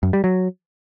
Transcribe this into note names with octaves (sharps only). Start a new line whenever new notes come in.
F#2
G3
F#3